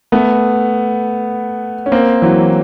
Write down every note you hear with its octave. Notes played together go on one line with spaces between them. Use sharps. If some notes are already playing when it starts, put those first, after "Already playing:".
A3 B3
C#4
A#3 C4
E3 F#3